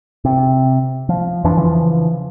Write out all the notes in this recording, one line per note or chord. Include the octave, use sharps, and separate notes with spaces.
C3
F3
F2 E3 F3 D4
C#3 E3 F3